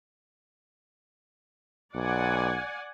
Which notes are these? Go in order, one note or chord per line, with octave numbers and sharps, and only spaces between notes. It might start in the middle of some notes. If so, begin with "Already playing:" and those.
B1 D5 F#5 G#5